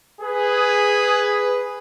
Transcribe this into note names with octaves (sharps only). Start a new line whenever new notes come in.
G#4 B4